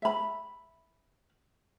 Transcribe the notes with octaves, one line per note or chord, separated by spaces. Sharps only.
E5 B5